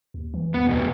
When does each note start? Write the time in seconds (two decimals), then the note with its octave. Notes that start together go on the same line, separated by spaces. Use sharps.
0.14 D#2
0.34 E3
0.54 D#2 B3
0.67 F1 B2